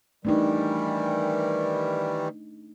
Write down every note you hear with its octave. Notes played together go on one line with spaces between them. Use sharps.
D#3 E3 G3 A3 D4 D#4